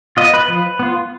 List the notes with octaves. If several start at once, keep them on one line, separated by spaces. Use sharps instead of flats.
B3 F4 D#5
B4
F3
B3 F4